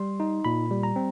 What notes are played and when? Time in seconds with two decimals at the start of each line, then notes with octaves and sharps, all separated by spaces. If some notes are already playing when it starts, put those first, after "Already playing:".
Already playing: G3 C6
0.20 D#4
0.45 A#2 B5
0.71 G3
0.83 A#5
0.96 C4